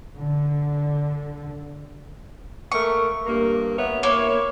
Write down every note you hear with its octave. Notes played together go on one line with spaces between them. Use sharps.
D3
A3 A#3 A#4 C#6
G2 A#3
B3 C#5 E5
A#3 E4 C#5